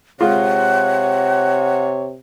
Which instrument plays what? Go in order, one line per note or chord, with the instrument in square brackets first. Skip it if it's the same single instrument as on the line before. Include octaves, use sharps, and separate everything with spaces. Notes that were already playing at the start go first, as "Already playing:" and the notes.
[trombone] C3 [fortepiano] G#3 F4 [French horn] C#5 [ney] F#5